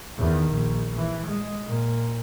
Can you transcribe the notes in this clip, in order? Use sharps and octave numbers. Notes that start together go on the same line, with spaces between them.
E2 D#3
A#1
E3
G#3
A#2